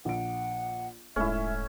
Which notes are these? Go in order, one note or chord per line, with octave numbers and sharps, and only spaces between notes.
A#1 F#5 D7
D#1 G#2 A3 C#4 E4 E5